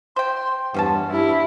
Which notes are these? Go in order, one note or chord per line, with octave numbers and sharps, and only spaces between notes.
C5 G5 C6
E2 G2 C3 C#4 B4 F#5 A5
G2 E4 G4